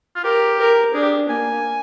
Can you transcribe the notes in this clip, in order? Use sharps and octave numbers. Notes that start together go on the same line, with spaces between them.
F4
G4 A#4
A#4
D4 G#4
G4
A#3 G#5